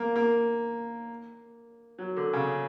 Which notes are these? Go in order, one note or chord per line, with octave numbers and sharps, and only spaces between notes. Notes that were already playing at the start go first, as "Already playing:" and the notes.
Already playing: A#3
A#3
F#3
D3
C#3